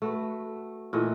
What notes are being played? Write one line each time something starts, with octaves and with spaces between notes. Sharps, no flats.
A3 F#4 B4
A#2 E3 A3 D#5